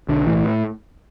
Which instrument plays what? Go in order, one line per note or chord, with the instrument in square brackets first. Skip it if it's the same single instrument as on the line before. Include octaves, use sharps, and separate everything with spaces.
[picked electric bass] B1 D3
A2 E3